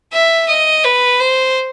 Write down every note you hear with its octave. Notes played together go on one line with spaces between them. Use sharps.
E5
D#5
B4
C5